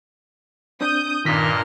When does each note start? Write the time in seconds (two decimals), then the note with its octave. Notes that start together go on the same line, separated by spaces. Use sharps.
0.81 C4 D4 D#6 G6
1.25 G2 A#2 D#3 A#4 D#5 F6 B6